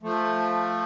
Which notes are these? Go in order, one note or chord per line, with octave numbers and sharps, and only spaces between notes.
F3 A3